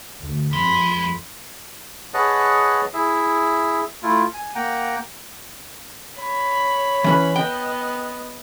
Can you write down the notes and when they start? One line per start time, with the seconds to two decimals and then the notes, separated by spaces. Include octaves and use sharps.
0.21 D2
0.53 F2 G#3 B5
2.14 G#4 B4 C#5 D#5 F#5 A5
2.94 E4 G#4 E5
4.03 A3 E4 F4
4.34 G#5
4.55 A#3 F#5 G5 A#5
6.17 C#5 B5
7.04 E3 C#4 B4
7.36 B3 D#5 G5